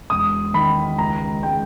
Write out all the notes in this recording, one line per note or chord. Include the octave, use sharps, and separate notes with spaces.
E1 D#6
D#3 B5
C#2 A#5
G#3 G5